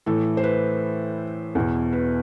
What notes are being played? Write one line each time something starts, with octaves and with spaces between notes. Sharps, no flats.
A2 E3 A4
C5
B4
E2 B2
B4